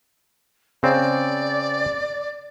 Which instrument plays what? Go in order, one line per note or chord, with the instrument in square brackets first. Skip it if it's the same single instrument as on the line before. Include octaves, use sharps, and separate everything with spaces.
[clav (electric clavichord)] C#3 C4 [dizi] D5